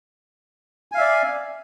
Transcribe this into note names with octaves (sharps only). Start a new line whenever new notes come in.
D5 E5 F5 G#5